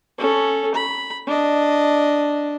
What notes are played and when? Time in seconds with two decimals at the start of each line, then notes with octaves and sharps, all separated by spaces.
0.18 C#4 A4
0.75 B5
1.27 D4 D#5